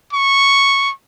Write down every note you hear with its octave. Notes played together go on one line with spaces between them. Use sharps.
C#6